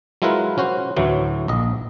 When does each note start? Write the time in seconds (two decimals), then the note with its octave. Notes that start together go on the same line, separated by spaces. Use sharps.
0.22 F#3 G#3 E4 F4 A#4 B4
0.58 C#4 F#4 C5
0.96 D2 A2 E3 F#3
1.48 A#1 D#5